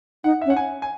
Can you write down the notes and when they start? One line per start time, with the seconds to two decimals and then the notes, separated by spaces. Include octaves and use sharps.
0.24 D#4 F#5
0.41 E5
0.46 C#4
0.50 F#5
0.57 G#5
0.82 G#5